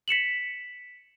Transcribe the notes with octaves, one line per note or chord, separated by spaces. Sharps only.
B6 C#7 E7 F#7